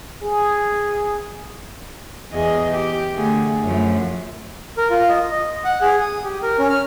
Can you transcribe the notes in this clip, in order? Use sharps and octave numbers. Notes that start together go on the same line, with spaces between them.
G#4
E2 G#4 D#5
G4
D3 A3 G#4
F#2 F3 A3
A#4
F4
D#5
D#5
F#5
G#4
D#6
G4
A#4
C#4
F6